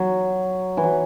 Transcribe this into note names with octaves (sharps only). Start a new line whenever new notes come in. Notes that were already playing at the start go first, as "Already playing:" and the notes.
Already playing: F#3
E3
F#3